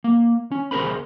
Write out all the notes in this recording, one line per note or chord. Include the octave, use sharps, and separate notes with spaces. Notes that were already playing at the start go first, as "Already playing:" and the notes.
A#3
C#4
D2 B2 G#4 A#4 C5 B5